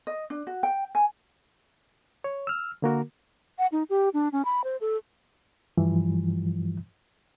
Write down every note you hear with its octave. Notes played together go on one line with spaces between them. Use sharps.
D#5
D4
F#4
G5
G#5
C#5
E6 F6
D3 A#3 F#4 A#4
F#5
D#4
G4
D4
C#4
B5
C5
A4
G2 E3 F3 G3